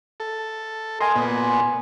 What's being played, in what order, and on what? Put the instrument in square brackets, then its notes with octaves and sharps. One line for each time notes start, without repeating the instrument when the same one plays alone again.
[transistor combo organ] A4
[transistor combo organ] A#4 D#5 [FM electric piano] G#5 C6
[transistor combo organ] A#2 B3